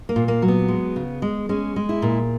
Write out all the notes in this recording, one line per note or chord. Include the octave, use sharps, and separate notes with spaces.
A#3
A#2
A#3
F#3
B3
G#3
C#3
G#3
G#3 C#4
G#3
E4
A#2